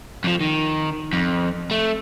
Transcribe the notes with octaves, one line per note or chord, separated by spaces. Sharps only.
F2 F3
D#3
F2
A3